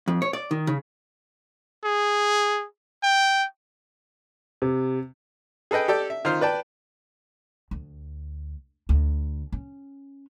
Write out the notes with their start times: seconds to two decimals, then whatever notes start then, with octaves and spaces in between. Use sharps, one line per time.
0.08 F2
0.22 C#5
0.33 D5
0.51 D#3
0.67 C#3
1.84 G#4
3.03 G5
4.62 C3
5.71 G#4 A4 B4 D#5 G5
5.88 G4 A4 D5 G5
6.10 E5
6.25 D#3 F4 C5 F6
6.41 B4 D5 G5 A5
7.71 D2
8.89 D2
9.52 C#4